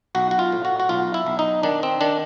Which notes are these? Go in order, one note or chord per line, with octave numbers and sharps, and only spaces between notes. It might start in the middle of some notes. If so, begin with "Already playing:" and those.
B1 F#4
F#4
F4
A2
F#4
F#4
B1 F4
E4
B1
D#4
D#3 D4
C4
D#3 D4